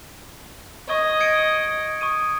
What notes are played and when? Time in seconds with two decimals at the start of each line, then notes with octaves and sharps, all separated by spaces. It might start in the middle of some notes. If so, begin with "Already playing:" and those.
0.89 D#5 C#6 D#6 G#6
1.20 G#6 C#7 D7
2.01 C#6 D#6 D#7